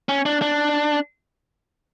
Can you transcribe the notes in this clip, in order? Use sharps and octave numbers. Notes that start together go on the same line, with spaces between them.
C#4
D4
D4